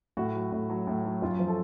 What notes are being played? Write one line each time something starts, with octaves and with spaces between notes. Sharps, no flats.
A2 F#4
F#3
A2
F#3
A2
F#3
F#2 F4
F3
A4